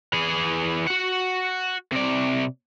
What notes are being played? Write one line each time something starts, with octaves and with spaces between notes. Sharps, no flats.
E3 G#4
F#4 F#5
C3 D5